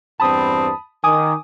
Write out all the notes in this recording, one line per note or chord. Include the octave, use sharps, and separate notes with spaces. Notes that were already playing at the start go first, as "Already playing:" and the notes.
E2 G2 C4 A5 B5 D#6
D#3 G#5 D6 D#6